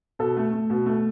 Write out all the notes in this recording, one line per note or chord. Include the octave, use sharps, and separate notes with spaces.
B2 A4
A3
A3
B2
A3